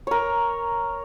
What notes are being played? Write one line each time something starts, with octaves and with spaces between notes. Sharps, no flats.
A#4 C#5